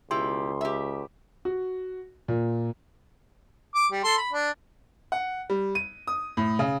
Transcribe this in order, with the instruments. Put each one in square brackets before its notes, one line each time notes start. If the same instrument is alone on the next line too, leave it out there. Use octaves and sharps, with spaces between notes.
[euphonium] C#2 [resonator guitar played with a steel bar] B2 E4 G4 [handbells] C6
[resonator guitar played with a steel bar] G4 E5
[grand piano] F#4
A#2
[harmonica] D6
G3
A4 C6
B5
D4
[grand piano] F#5
G3
D#7
D#6
A2
C#3